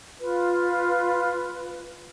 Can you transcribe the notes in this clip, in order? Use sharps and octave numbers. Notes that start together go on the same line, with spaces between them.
F4 B4